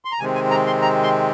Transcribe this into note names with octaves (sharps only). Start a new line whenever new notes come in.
C6
A#5
C3 D#3 G#3 C4 G#5
G#5
A#5
C6
A#5
C6